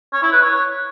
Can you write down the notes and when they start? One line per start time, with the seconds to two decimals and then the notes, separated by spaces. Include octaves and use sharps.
0.13 C#5
0.23 E4
0.32 B4
0.42 C#5